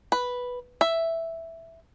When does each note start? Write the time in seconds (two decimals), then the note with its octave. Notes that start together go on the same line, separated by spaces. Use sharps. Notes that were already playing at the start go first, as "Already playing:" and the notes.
0.12 B4
0.81 E5